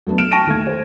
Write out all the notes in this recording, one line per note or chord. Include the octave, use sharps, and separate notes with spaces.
F#3 A3 B3 D4
F6 D7 E7
G5 A5 C#6 A#6 D7 D#7
D#2 A3 G#6
C5